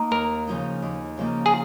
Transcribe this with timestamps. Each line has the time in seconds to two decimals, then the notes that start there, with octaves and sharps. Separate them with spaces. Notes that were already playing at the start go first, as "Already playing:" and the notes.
Already playing: A#3 D#4
0.11 D#2 A#4
0.47 C#3 F3 A#3 D#4
0.82 D#2
1.17 C#3 F3 A#3 D#4
1.46 G#4